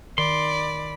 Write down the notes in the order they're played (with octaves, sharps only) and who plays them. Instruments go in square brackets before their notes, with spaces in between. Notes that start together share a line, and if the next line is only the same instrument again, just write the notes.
[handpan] D#3 [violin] D5 [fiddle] B5 [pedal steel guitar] C6